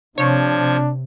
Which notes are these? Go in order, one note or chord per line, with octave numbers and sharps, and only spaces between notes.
C3 F3 D4 C#5 G#6